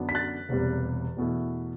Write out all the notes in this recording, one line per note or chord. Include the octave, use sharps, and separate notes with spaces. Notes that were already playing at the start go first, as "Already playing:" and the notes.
Already playing: F#2 D3 F#3 B3 D4
B6
F#6 A6
E1 E2 C3 G3
E2 B2 A3 E4